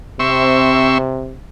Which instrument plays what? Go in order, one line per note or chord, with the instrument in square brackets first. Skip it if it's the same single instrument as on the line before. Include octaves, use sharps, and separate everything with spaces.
[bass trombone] C3 [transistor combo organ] C4 E5 C#6